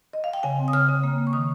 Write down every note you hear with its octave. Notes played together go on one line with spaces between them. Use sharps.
D#5
F5
G5
C#3 G#5
C4
D#6
C#3 F6
C#3
A#3
A#3
C#6
D#3 D#6